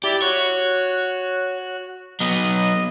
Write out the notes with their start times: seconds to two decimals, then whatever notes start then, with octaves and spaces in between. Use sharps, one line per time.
0.04 E4 G4 D5
0.22 F#4 C#5 F#6
2.20 F#3 B3 D#5